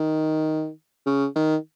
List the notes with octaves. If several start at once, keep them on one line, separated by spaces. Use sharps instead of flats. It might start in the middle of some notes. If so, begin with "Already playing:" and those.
Already playing: D#3
C#3
D#3